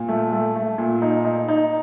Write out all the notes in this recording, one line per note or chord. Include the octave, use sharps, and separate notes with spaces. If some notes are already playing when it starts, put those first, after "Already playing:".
Already playing: A#2
A3
A3
A3
A#2
D#4
D#4
D#4